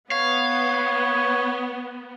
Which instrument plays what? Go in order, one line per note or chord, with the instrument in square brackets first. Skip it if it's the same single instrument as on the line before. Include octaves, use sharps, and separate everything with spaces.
[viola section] B3 [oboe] C#5 [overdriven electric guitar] F5